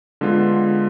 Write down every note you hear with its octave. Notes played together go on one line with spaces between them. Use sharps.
D3 G#3 B3 F4